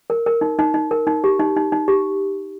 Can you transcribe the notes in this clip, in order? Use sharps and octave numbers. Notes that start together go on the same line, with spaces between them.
A#4
A#4
D#4
D#4
D#4
A#4
D#4
G4
D#4
D#4
D#4
G4